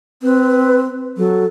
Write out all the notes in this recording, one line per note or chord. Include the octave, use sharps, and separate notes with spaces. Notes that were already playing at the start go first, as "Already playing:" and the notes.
C4 B4
F#3 A4